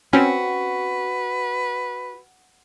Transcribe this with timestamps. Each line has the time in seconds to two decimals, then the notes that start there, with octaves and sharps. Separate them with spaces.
0.13 C4 C#4 F#4 B4